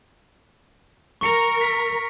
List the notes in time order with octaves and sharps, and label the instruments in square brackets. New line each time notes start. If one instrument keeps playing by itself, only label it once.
[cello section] A#4 [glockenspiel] C#6 C#7 F7
[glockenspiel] B6